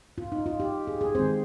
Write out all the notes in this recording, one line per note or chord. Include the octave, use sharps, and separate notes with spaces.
F4
D#4
F4
G4
G#4
G#4
D#3 G#3 C4 C5